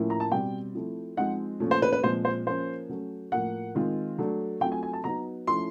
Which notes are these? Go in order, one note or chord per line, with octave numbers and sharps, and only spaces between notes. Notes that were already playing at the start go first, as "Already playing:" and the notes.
Already playing: A2 F3 A#3 C#4 E4
A#5
A5
B2 G3 C4 G5
F3 A3 C4 E4
F3 G#3 C4 D#4 F#5
A#2 F3 A3 C#4
C5
B4
B4
A#2 F3 G#3 C4 C5
C5
F3 A#3 C#4 F4 C5
F#3 A3 C#4
A2 F3 A#3 F#5
D#3 G#3 C4 F4
F#3 A3 D4
F#3 A3 C4 F4 G5
G#5
G#5
A5
F#3 B3 D#4 A#5
F3 A3 C#4 E4 C6